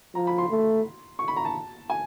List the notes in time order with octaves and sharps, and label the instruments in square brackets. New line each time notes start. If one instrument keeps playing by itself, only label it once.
[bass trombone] F3 [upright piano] A#5
[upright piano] B5
C6
[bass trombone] A3
[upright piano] C#6
B5
A#5
A5
G#5